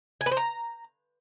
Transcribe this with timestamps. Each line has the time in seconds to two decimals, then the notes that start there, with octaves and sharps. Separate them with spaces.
0.21 G#5
0.26 B4
0.31 C5
0.37 A#5